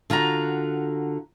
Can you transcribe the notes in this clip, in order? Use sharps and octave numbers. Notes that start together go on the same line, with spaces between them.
D3 F4 F#4 A#5